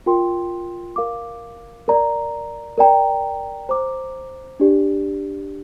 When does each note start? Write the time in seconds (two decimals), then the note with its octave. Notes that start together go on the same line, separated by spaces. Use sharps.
0.06 F4 A#4 G5 C6
0.96 A#4 F5 D6
1.88 A#4 D5 A#5
2.78 A#4 D5 G5 A#5
3.69 C5 A#5 D6
4.60 D4 G4 D5